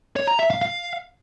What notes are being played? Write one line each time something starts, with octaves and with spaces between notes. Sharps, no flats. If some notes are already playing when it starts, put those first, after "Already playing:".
C#5
A#5
E5
F5
F5